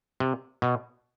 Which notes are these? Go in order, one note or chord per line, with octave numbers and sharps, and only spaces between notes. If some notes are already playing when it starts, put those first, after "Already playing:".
C3
B2